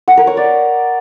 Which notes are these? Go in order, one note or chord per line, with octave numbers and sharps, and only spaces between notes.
F#5
A#4
C#5
D5